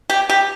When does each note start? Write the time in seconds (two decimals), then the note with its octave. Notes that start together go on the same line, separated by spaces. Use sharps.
0.10 G4
0.30 G4